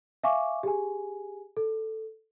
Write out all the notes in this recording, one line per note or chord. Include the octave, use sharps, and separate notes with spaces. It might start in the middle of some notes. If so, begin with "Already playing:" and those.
E5 F5 G#5 C#6 D6
G4 G#4 G#5
A4